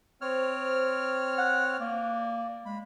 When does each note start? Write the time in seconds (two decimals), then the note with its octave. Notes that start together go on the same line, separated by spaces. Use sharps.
0.21 C4 C5 C#5 F6
1.38 F#5
1.80 A#3 D5
2.65 G#3 B5